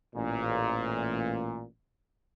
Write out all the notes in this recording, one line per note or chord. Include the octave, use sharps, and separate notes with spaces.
A1 A#2